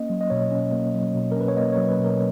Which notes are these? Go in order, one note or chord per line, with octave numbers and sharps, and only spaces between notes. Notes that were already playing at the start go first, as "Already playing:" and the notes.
Already playing: A#3 C#4 D#5
F#3
D#5
B2 C#5
C#4
A#3
F#3
B2
A#4
C#4 B4
C#5
A#3 D#5
C#5
F#3
B4
B2 A#4